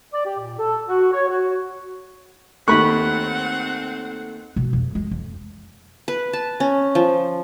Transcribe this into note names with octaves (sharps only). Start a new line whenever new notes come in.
D5
G4
A#2
A4
F#4
C#5
F#4
D#2 A3 C4 F#5 B5 C#6 F#6
B2
F2
G#3
F2
B4
A5
C#4
F3